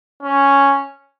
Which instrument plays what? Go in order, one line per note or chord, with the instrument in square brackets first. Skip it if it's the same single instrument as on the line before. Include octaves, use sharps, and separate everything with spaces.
[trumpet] C#4